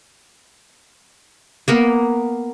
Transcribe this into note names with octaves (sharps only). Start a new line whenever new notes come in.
A#3 B3 A#4